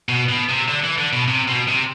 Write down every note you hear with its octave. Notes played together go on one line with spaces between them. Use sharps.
B2
B2
C3
D3
E3
D3
B2
C3
B2
C3